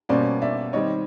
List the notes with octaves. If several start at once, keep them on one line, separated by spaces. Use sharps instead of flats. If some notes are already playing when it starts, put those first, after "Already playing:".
B2 G3 A#3 C#4 C5 D5
D5 E5
D#3 G3 C4 C#5 D#5